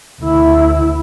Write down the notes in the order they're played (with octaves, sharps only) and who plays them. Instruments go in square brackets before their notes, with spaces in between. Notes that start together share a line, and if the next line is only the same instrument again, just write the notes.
[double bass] D2 E4